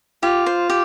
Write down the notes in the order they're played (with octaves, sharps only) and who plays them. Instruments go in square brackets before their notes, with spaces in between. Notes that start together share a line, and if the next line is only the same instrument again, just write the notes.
[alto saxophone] F4 [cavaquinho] G4
[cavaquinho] C5
G4